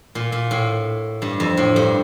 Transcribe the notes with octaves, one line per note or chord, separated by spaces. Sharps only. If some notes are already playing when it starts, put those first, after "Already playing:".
A#2
A#2
A2
G2
F2
A2
G2